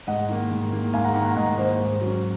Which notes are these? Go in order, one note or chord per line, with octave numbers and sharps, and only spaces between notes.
G#2 D#5 F#5
D#3 A#3
G#2
D#3 A#3
G#2 F5 G#5
F#5 A#5
D#3 A#3 F#5 A#5
F#5 A#5
G#2 D#5 F#5
D#3 A#3 C5 D#5
G#2
F#3 C#4